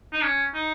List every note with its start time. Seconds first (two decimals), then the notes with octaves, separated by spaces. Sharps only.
0.13 D#4
0.23 C#4
0.54 D#4